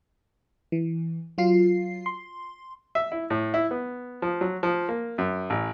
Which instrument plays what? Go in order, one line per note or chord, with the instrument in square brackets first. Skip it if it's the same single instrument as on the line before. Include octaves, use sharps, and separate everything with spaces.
[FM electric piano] E3
F#3 F4 C7
C6
[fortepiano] E5
E4
A2
E4
B3
F3
F#3
F3
A#3
F#2
A1